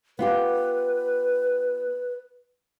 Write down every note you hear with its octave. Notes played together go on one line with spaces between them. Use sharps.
B3 F4 G4 B4